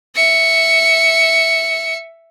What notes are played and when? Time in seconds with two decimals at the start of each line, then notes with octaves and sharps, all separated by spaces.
0.16 E5 C#7